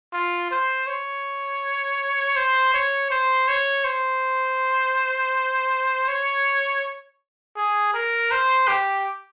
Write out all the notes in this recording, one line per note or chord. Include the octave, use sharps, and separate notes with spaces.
F4
C5
C#5
C5
C#5
C5
C#5
C5
C#5
G#4
A#4
C5
G4